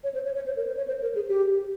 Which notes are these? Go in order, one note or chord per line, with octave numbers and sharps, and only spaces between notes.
C#5
C5
C#5
C#5
C5
A#4
C5
C#5
C5
A#4
G#4
G4